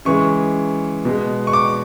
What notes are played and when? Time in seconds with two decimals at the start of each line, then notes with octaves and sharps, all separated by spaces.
0.05 C#3 E3 G#3 C#6
1.05 B2 G#3
1.47 C#6
1.53 D6